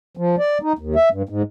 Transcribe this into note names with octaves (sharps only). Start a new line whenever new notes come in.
F3
D5
D#4
D#2
E5
G2
G#2